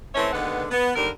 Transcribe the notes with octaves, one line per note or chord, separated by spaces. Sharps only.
E3 A3 C4 C#4 C#5 E5
D#2 D3 G#3 B3 B4 F#5
B3
D#2 D3 G3 A#4